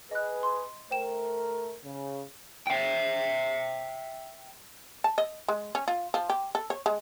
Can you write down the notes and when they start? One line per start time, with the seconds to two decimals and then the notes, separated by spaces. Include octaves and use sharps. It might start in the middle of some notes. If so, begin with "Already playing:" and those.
0.11 G#4 B4 D#5 F#6
0.43 C6
0.91 A3 A#4 C5 G5 E7
1.84 C#3
2.67 E5 G5
5.04 A5
5.18 D#5
5.48 G#3
5.75 C#4
5.88 F4
6.14 F3
6.30 G4
6.55 A4
6.70 C#5
6.86 G#3